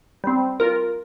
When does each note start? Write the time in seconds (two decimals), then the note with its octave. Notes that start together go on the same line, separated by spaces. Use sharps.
0.24 G3 C4
0.60 F4 A#4